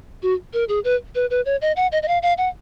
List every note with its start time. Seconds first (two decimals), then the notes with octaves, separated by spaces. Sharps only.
0.23 F#4
0.53 A#4
0.69 G#4
0.84 B4
1.15 B4
1.30 B4
1.46 C#5
1.62 D#5
1.76 F#5
1.92 D#5
2.03 D#5
2.08 F5
2.23 F5
2.38 F#5